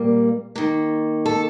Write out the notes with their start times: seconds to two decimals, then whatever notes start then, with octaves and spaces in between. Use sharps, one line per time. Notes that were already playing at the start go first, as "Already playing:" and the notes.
Already playing: A#2 G3 A#3
0.55 D#3 A#3
1.26 A4